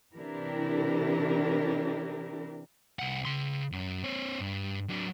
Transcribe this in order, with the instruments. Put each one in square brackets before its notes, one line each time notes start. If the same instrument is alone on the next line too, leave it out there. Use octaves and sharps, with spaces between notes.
[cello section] C3 E3 D4 E4 G4 A#4
[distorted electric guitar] C2 F#5
C#3 C6
F#2
C4 C#5
G2
F#3 D4